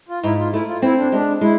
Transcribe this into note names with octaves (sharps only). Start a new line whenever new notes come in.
F4
G#2 E4
F4
A3 E4
F4
C4 E4
D4
G#3 D4
G#3 E4